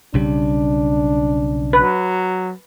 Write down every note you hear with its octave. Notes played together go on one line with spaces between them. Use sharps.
B1 C#3 G3 D4
F#3 B4